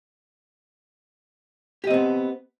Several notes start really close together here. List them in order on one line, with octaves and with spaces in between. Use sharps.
G4 D#5 C4 B3